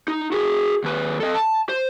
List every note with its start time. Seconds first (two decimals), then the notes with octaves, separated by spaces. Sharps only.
0.08 D#4
0.32 F#4 G#4
0.84 D#2 B4
1.20 A4 D#5
1.34 A5
1.69 C5